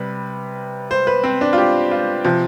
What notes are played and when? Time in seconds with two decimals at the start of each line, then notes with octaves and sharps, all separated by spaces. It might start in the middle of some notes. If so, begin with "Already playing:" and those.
Already playing: C3 G3 B4
0.91 C5
1.07 B4
1.24 C4
1.41 D4
1.53 F4
1.58 G4
1.91 F4
2.25 C3 F3